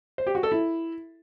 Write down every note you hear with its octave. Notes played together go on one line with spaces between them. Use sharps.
C5
G4
F#4
A4
E4